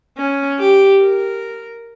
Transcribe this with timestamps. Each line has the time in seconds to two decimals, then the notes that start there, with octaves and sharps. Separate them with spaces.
0.18 C#4
0.59 G4
1.02 A#4